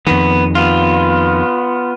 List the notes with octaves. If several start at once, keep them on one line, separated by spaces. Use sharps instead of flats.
F2 D#3 B3
B3 F4